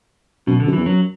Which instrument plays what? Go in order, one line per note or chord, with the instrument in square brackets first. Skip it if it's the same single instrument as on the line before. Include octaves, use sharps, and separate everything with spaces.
[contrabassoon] F#2 [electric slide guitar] B2
[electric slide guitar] D3
[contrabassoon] F#2
[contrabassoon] E2 [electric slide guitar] E3
[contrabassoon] F#2 [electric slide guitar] F#3